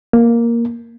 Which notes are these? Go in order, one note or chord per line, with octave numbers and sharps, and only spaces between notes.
A#3